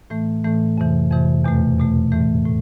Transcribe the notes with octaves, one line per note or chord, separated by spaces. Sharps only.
A2 E3 A3
A2 E3 A3
F2 C3 E3
F2 C3 E3
E2 B2 A3
E2 B2 A3
A2 E3 A3
A2